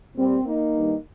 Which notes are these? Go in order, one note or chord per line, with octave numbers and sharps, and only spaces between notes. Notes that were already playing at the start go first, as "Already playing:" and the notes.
A#2 G3 C4
A#3 D#4
G2 D#3 G3